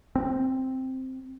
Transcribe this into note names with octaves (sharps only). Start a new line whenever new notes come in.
C4